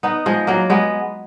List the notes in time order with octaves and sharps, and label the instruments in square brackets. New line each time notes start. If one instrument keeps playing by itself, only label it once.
[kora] B3 D#4
F3 G#3
F#3 A#3
G#3 B3